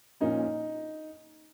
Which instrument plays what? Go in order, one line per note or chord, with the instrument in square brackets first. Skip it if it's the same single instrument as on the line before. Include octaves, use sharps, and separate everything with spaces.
[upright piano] A#2 F3 A#3 C#4 D#4